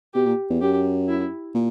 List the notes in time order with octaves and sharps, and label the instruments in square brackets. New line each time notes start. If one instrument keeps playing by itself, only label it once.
[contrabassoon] B2 [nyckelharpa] G4
[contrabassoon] A#2
E2
[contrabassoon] F#2 [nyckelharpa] G4
[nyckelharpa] E4
[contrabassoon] A#2